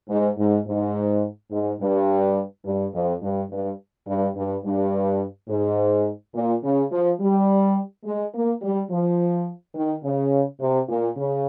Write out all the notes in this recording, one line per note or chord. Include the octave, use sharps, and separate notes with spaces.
G#2
G#2
G#2
G#2
G2
G2
F2
G2
G2
G2
G2
G2
G#2
A#2
C#3
F3
G3
G#3
A#3
G3
F3
D#3
C#3
C3
A#2
C#3